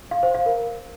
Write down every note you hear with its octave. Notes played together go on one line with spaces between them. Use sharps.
F5
C5
F5
A#4